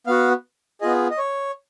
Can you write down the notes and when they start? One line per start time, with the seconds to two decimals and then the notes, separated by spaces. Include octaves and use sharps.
0.07 B3 F#4 F5
0.81 B3 F4 G#4 D#5
1.11 D#5
1.18 C#5